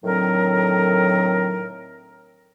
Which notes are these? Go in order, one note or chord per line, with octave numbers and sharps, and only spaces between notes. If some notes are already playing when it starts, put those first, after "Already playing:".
A2 D3 D#3 F#3 C4 A#4